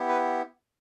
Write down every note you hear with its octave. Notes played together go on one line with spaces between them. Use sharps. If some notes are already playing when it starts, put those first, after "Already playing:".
Already playing: B3 E4 G4
B4